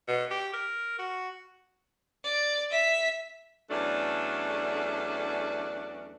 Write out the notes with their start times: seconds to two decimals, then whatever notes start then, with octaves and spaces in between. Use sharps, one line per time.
0.08 B2
0.31 G4
0.53 A#4
0.99 F#4
2.24 D5
2.71 E5 B6
3.71 E2 F#3 A3 C#4 D4 D5